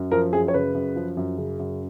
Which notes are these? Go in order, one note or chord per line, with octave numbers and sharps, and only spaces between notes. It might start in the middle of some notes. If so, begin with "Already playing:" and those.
Already playing: F#2
F3 A#4
F#2 G#4
C#5
C#3 B4
F#2
F3
F#2
C#3
F#2